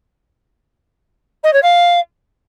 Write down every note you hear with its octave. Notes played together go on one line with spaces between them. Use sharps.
D#5
C#5
F5